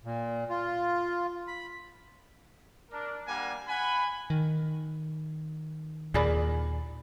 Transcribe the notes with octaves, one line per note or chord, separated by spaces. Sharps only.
A#2
F4
B5
D4 A#4
G3 A#3 D4 F#5 G#5
F#5 G#5 B5
D#3
D#2 A#2 G#4 D5 B5